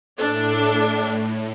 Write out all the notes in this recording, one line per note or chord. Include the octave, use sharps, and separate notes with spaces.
A2 D4 A4